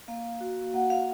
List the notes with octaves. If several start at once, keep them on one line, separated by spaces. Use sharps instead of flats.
A#3 F5
F#4
A#3 F#5
F5